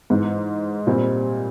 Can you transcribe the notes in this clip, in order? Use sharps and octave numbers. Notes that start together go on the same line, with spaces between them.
G#2 E3 G#3
A#2 G3 C4